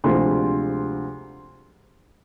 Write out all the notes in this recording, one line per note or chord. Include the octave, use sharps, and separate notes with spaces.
D2 C3 F3 G#3 C6